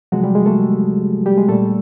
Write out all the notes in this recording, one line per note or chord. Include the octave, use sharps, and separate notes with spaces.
C3 F3 F#3 G#3 F#4
G3 G4
G#3 G#4
A3 A4
G3 G4
G#3 G#4
A#2 G3 A3 A4